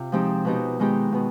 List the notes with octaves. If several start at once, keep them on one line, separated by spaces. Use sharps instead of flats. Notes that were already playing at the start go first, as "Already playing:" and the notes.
Already playing: C3 F4
F3 G#3 C4 D#4 G4
B2 B3 D#4 G4
D#3 G#3 B3 D#4 G4
B2 B3